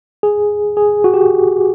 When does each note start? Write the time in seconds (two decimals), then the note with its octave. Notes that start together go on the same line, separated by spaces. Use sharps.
0.23 G#4
0.77 G#4
1.04 F#4
1.14 G4